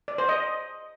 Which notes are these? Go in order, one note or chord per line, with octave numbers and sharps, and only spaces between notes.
D5
C5
D#5